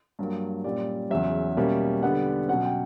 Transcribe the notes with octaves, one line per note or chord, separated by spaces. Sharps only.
G2 F#3 A#3
A#2 G3 C#4 D5
E2 C#3 F#3 E5
B2 G3 A#3 C#4
D3 G3 B3 D4 F#5
B2 F#3 C#4 F#5
G5